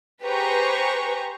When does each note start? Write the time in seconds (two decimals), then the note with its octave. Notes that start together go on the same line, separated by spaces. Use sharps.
0.23 G4 G#4 B4 C5 A#5 C#6